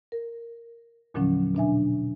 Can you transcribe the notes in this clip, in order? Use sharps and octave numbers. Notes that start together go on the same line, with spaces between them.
A#4
E2 A#2 D3 F3 F#3 C#4
B2 D4 E5 G#5